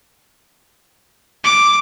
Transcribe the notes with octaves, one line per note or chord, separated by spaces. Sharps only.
D6